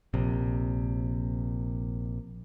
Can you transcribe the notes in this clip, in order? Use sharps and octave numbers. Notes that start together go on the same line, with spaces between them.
A#1 C3